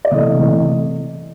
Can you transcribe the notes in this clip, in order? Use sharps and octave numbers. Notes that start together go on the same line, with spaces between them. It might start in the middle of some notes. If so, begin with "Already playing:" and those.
D5
C3 E3 A3 D#5
C3 E3 A3